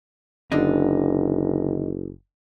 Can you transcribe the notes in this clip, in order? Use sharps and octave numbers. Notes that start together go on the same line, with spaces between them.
F#1 D3 D4 D#4